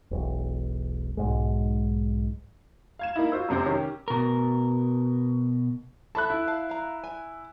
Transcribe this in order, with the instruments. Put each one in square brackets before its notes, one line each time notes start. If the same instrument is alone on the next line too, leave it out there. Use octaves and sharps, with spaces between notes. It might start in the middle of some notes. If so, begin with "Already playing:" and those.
[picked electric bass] E1 B1
B1 G#2 G#3
[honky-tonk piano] F5 G#6 E7
A#3 D#4 E4
F4 F#4 C5 E6
F1 F#2 C3 C4 C5
D#3 C#4 G4
[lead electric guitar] B2 A#4
[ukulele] A4 E5 [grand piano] A5 B5 F#6
[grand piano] E4
[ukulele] F5 A5
F5 A#5
G#5